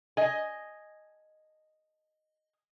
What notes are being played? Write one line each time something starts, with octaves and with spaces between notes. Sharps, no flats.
D#5 G#5